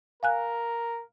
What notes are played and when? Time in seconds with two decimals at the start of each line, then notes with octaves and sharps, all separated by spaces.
0.23 A#4 F5 G#5 F#6